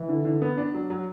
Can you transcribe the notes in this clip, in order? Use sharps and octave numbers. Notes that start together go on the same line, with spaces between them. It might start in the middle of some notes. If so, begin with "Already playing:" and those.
Already playing: E3
D3
D3
B3
D4
F#3
F#3